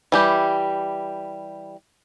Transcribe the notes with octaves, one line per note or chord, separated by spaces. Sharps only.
E3 G3 G4